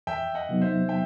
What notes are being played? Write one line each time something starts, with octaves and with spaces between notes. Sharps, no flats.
E2 E5 G5
D#5 F#5
C3 F#3 B3 D#4
C5 E5
E5 G5